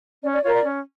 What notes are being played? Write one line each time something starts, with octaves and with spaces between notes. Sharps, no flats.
C#4 D5
D5
F4 A#4 C#5
D5
C#4